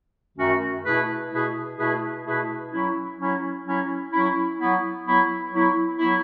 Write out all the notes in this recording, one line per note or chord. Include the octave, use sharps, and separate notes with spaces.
F#2 D#3 A3 C#4 F#4
B2 A3 E4 G#4 B4
B2 A3 E4 G#4 B4
B2 A3 E4 G#4 B4
B2 A3 E4 G#4 B4
F#3 C#4 E4
F#3 C#4 E4
F#3 C#4 E4
F#3 C#4 E4
F#3 B3 E4
F#3 B3 E4
F#3 B3 E4
F#3 B3 E4